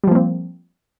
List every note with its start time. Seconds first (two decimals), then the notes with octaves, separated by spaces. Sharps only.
0.04 G3
0.07 F3
0.11 A#3
0.15 C4